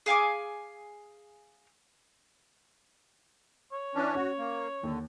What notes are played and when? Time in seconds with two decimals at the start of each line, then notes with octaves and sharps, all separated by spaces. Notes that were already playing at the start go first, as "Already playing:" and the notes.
0.06 G#4 F5 G#5 D6
3.73 C#5
3.95 E3 C#4 D4
4.15 C#4 F#4
4.38 A#3
4.83 D#2 D3